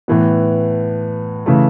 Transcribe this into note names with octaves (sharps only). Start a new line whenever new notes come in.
A2 E3 B3
C#3 E3 A3